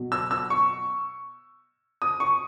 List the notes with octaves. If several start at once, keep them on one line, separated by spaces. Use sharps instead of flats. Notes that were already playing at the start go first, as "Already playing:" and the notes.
Already playing: B2 F#3
E6
E6
C#6
D#6
C#6